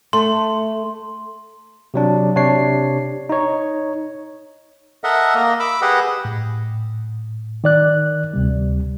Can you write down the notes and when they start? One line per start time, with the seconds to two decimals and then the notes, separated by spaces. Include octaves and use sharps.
0.13 A3 C6
1.94 C3 F#3 D4
2.36 C3 D4 C#5 C7
3.29 D#4 C#5
5.04 A4 A#4 D#5 E5 F#5
5.35 A#3 A#4 D#5
5.60 B5 D6 E6
5.82 G4 G#4 B4 D#5 F#5
6.25 A2
7.64 D#3 D5 F#6
8.34 D2 C3 G3